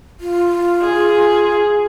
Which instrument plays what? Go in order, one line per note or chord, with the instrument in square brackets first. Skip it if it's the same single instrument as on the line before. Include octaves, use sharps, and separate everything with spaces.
[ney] F4
[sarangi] G#4